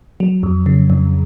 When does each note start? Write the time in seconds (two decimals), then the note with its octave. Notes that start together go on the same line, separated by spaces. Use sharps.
0.20 F#3
0.43 F2
0.66 C#3
0.90 F2